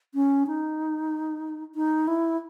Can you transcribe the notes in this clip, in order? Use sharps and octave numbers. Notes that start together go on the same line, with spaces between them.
C#4
D#4
D#4
E4